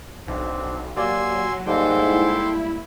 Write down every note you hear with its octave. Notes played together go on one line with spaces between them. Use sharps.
B1 C4 D4
F#3 A#3 G4 D5 G#5 C6 E6
G#2 G3 G#3 A#3 A4 G5 C6
E4